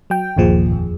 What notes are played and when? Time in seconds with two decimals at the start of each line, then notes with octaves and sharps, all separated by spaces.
0.10 F#3 G5
0.37 G1 D#2 A#2 F3 G#4
0.72 F2